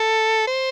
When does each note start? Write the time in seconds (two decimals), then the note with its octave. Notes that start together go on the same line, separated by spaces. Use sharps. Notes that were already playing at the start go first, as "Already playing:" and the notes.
Already playing: A4
0.47 C5